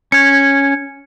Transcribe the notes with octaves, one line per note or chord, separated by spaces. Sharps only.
C#4 G#6 C#7